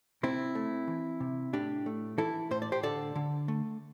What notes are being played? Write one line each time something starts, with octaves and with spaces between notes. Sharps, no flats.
C3 C4 E4
A3
E3
C3
A2 D4 G4
A3
E3 E4 A4
A2 C5
D5
G4 C5
D3 A4 D5
D3
A3